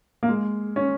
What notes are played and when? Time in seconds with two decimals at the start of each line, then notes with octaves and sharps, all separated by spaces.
0.23 A#3
0.29 G#3
0.76 C#4